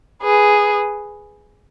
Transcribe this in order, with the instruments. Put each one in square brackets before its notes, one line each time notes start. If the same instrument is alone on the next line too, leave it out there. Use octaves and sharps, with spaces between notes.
[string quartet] G#4 B4